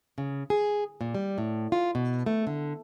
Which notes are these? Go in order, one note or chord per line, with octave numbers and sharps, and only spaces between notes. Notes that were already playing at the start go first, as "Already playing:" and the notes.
C#3
G#4
A#2
G3
A2
F4
B2
A3
D3